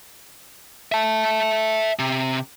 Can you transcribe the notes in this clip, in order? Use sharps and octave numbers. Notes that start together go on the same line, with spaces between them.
E5 A5
C3